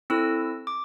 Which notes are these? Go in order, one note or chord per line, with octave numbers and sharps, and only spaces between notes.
C4 E4 A4 E6
D6